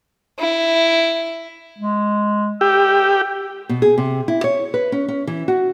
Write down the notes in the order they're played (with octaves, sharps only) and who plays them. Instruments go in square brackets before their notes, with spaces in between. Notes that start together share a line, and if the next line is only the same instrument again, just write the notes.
[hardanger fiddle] E4
[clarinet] G#3
[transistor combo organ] G4 [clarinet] E6
[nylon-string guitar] B2
G#4
C3
E4
C#5
B4
C#4
C#4
E3
F#4